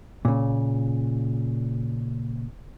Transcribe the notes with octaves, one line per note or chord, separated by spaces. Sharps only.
A#2 C#3